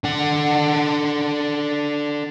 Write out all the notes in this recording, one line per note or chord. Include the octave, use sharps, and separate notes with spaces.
D3 F#5